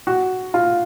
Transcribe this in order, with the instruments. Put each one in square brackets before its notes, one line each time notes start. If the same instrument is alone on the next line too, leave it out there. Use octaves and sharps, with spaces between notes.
[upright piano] F#4
F4